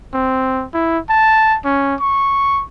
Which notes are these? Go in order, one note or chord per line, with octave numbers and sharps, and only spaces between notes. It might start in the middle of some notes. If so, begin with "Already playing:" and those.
C4
E4
A5
C#4
C#6